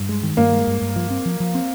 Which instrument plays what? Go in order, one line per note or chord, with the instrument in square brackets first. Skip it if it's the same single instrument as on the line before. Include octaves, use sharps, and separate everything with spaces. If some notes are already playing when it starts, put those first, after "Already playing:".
Already playing: [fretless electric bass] G2
G#3
D#3
[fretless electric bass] G2 [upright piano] A#3
[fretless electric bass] G#3
G2
G2
F3
C4
F3
F3
C4